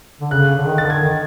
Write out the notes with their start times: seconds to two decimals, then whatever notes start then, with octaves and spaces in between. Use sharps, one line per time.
0.21 D3
0.31 C#3 F#6
0.57 D3
0.66 D#3
0.78 A6
0.84 D3
0.90 G#6
1.02 D#3